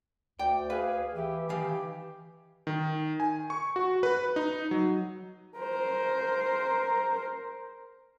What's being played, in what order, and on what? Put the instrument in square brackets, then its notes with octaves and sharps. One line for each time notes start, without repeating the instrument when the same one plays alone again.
[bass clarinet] D2 [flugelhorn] D5 [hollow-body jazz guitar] G5
[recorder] G#4 [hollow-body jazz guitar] B4 [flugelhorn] F5
[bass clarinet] E3 [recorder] G4 [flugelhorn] E5
[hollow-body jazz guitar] D#3 F5 [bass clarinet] E3 [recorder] G4 [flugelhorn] G#5
[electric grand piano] D#3
G#5
C#6
F#4
B4
D#4
F#3
[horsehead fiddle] A#4 C5